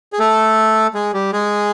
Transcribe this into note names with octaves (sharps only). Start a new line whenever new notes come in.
G#4
A3 A4
G#3 G#4
G3 G4
G#3 G#4